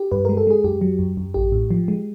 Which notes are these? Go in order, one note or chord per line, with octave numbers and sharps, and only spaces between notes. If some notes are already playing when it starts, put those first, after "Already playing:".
Already playing: G4
G2 B4
G#3 A#4
A4
G#3 G#4
F#2 G4
F#3
F#2
F#2
A1 G4
A2
F3
G#3